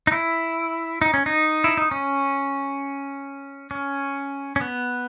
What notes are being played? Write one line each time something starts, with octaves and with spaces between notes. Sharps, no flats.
D#4
E4
D#4
C#4
D#4
E4
D#4
C#4
C#4
C#4
B3